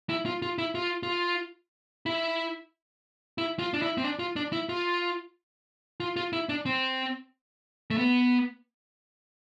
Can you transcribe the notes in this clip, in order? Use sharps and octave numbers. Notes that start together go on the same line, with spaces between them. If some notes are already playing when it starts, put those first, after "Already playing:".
E4
F4
F4
E4
F4
F4
E4
E4
F4
D4
E4
C4
D4
F4
D4
E4
F4
F4
F4
E4
D4
C4
A3
B3